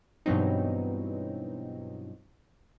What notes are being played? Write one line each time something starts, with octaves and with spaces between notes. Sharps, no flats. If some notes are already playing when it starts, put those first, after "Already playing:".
G2 B2 E3 F#3 C4 D#4